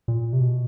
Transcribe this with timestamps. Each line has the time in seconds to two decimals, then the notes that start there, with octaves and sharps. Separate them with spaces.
0.08 A#2
0.33 C3
0.40 B2